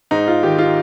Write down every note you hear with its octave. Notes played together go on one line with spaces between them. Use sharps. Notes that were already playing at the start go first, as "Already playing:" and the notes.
G#2 D#4
F4
D#3 G4
F4